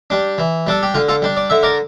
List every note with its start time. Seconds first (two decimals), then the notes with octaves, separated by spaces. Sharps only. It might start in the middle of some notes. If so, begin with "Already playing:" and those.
0.10 G3 D4
0.38 E3
0.67 G3 D4 A4
0.83 G4
0.94 D3 F4
1.08 F4 A4
1.22 G3 D4
1.37 D5
1.50 D3 E5
1.63 A#4 D5